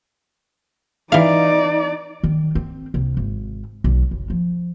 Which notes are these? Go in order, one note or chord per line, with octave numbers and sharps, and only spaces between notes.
E3 D#4 D5 F5
D#3
C4
C2
G#1
B1
F#1
F3